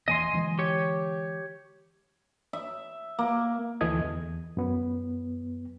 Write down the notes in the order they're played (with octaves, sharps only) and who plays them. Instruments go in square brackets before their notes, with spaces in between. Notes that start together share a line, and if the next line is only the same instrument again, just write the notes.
[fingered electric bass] E1 E3 A#3 [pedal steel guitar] D#5 G#5 C6
[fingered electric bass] D3 E3 G#3
[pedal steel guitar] G4 C#5
[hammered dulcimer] E5
A#3
[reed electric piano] D2 E3 A4 D#5 D#6 G#6
E2
F#2 B3